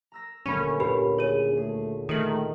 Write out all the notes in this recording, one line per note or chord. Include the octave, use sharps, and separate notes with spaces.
A#5 E6 A#6
D#1 D2 D3 C#4 B5 C#6
A#2 G4 B4 B5
G#4 C#5 D#7
A3 G#4
D#3 A3 D#6 F#7